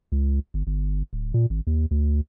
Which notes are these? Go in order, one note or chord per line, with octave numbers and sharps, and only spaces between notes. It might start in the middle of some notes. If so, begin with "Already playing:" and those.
C#2
G1
G1
D1
A#2
G#1
D#2
D2